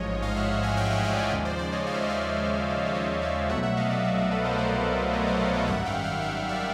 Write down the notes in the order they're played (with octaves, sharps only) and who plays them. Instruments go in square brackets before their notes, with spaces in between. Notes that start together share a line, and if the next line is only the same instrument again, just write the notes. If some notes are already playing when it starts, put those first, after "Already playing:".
Already playing: [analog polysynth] A1 G#2 F3 G#3 C#5 D#5
D#5 F5
E5 F#5
F#5 G#5
F5 G5
E5 F#5
D#5 F5
D5
C#5 D#5
D#2 C#3 F3 G#3
C5 D5
C5 D5
C#5 D#5
F5
E5
D#5
D5 E5
C5
C#5
D5
C#5 D#5
D5 E5
C2 B2 F#3 A3 E5 F#5
E5 F#5
D#5 F5
D5 E5
D5 E5
D5 E5
A4 B4
A#4 C5
D#5
C5 D5
C#5 D#5
C5 D5
C5 D5
C#5 D#5
G#1 F#2 D#3 G3 E5 F#5
F5 G5
F5 G5
E5 F#5
D5 E5